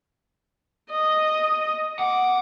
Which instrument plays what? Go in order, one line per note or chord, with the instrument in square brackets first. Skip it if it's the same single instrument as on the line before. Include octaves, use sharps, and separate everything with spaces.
[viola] D#5
[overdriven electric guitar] F#5 [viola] D6